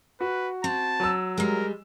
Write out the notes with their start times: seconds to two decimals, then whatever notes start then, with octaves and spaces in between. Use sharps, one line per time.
0.21 F#4 B4
0.64 C4 A5
1.00 F#3 E6
1.38 G3 G#3 A#4